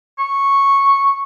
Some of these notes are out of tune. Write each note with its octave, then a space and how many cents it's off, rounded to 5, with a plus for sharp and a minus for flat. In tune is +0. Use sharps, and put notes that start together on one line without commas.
C#6 -5